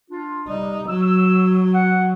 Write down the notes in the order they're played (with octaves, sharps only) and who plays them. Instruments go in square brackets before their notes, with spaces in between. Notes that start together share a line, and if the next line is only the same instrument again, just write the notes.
[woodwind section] D4 F4
[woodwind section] C3 G3 [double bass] D#4
[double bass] F#3 [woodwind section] E6
[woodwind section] F#5